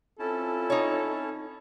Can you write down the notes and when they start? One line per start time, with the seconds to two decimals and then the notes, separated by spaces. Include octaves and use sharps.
0.19 C4 C#4 E4 F4 A4 A5
0.70 D#4 C#5